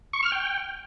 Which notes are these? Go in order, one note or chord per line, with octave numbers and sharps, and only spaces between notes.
C#6
F6
G5